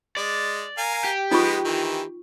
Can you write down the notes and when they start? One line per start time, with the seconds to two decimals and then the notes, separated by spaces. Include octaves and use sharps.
0.17 G#3 D5
0.78 A#4 F5 G#5
1.04 G4
1.31 G#3 B3 D#4 F4 C#6
1.65 D#3 E3